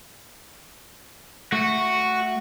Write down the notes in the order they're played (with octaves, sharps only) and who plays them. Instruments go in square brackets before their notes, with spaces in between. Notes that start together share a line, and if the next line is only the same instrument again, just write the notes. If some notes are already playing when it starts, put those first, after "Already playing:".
[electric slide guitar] A3 [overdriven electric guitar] F#4